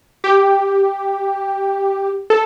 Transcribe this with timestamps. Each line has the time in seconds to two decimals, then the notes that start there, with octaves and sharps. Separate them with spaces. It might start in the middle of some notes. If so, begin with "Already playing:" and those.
0.24 G4
2.30 A4